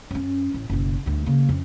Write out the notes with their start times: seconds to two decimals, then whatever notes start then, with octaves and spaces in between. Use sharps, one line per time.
0.11 F#2 C#4
0.54 A1
0.70 F#1 B1
1.06 D2 G2
1.26 C#3 A#3
1.49 F2 C#4